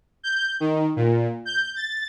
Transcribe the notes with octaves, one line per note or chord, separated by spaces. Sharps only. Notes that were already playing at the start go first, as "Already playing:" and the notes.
G6
D#3
A#2
G6
A6